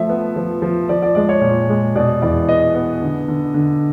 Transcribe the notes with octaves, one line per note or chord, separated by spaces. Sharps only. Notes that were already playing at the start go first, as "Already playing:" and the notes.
Already playing: F3 A3 E5
B3
F3
F3
F3 D5
D5
G#3 D5
C#5
A#2
G#3
B2 D5
E2 D5
B3 D#5
B3
D3
D3
D3